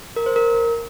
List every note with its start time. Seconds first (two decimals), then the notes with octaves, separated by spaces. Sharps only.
0.16 A#4
0.26 C5
0.36 A#4